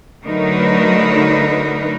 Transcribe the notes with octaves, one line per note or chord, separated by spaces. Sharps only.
D3 F#3 A3 D#4 A#4 B4